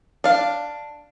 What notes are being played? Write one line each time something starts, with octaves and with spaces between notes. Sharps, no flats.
D4 F5